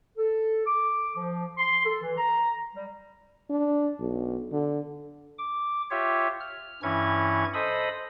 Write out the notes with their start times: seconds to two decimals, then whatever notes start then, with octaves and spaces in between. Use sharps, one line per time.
0.18 A4
0.67 D6
1.16 F3
1.58 C6
1.85 A4
2.02 E3
2.18 A#5
2.75 G3
3.50 D4
4.00 B1
4.52 D3
5.38 D6
5.91 F4 G4 C#5 E5
6.40 F6
6.83 G2 E3 C#4 E4 C#6 G#6
7.54 A4 C5 D#5 B5 D#6